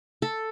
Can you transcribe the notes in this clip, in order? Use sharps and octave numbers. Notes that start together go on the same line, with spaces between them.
A4